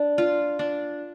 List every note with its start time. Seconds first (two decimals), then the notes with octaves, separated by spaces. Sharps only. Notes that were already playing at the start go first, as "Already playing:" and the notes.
Already playing: D4
0.18 F4
0.59 D4